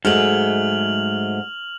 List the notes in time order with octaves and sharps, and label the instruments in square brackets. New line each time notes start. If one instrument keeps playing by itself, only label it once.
[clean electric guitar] G#2 [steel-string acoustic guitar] F#3 G#3 A3 [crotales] F6 F7 F#7